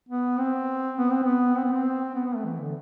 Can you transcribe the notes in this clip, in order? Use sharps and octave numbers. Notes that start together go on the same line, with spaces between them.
B3
C4
B3
C4
B3
C4
B3
C4
B3
B3
A3
E3
D3